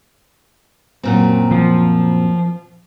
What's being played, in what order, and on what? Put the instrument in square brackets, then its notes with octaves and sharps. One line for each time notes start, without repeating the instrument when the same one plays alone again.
[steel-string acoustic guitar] F#2 A#2 C4
[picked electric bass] F3